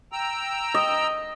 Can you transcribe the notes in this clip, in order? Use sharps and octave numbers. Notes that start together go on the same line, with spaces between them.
G5 A#5 E6
D#5